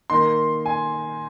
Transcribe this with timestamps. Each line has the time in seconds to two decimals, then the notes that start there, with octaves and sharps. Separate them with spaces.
0.10 D#3 A#3 D#4 C6
0.66 G#5